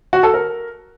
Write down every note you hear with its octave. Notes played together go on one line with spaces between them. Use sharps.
F#4
A4
A#4